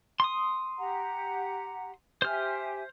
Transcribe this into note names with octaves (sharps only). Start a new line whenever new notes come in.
C6 D#6
G4 F#5 A#5
G4 C5 E5 G#5 F6